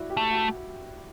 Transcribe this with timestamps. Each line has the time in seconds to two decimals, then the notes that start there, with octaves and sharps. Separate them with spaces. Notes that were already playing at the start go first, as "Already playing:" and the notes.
Already playing: D4 E4 F#4
0.10 G4
0.17 A3
0.31 F#4